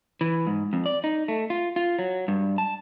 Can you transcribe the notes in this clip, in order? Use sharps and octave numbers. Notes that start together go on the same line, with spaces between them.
E3
G#2
F2
D5
D#4
A3
F4
F4
F#3
G2
A5